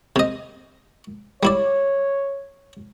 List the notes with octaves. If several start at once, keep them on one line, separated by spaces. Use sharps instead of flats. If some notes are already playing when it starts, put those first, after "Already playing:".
C3 D#5
G3 E4 C#5 D5